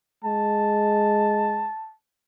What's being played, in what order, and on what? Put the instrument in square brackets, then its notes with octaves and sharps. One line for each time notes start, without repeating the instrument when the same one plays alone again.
[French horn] G#3 [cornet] A5